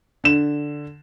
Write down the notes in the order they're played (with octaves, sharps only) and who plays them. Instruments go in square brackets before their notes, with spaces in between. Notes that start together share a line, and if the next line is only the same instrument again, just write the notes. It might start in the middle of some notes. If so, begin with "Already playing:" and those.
[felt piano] D3 E7